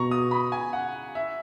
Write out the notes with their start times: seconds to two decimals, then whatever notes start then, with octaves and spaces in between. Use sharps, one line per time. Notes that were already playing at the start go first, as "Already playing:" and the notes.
Already playing: B2 A#5 C#6
0.11 D#6
0.31 B5
0.52 G#5
0.73 F#5
1.15 E5